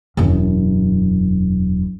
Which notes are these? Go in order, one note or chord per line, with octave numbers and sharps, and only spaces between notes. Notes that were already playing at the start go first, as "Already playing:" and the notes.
E1 F#2